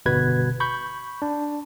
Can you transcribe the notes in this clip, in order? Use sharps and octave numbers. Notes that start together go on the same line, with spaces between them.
G1 B2 B4 G#6
B5 C#6 G6
D4